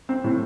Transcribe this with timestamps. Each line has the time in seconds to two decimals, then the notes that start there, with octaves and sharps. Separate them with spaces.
0.09 C4
0.24 A2